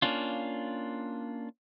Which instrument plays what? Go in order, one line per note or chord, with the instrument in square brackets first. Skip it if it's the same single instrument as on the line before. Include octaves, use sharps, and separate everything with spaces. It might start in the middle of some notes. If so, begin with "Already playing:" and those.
[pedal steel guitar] A#3 C#4 D4 F4